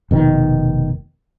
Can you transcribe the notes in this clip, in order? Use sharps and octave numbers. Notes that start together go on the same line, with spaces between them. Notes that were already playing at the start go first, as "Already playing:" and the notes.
F1 B2 D#3